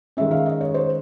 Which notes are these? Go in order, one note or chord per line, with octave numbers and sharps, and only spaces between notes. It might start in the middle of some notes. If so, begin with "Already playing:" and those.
D#3 G#3 C#4 E5
F5
D#5
C#5
C5